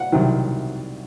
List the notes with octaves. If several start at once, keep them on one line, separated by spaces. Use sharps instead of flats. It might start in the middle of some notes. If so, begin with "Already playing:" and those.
Already playing: F#5
C2 C3 D#3 F#3